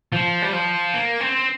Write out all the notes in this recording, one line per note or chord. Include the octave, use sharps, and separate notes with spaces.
F3
G3
F3
A#3
C4